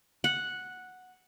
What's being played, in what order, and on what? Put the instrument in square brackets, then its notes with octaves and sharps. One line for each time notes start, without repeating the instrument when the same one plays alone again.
[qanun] F#5